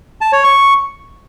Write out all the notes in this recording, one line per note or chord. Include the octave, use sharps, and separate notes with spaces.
A5
C#5
C#6